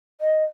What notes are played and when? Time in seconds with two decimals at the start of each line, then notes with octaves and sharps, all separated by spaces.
0.21 D#5